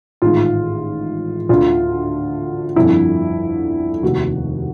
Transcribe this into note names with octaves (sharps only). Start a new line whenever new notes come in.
A1 G#2 D#3 F4
D2 D3 F4
G1 F2 D3 E4
F1 D#2 D#3 F#4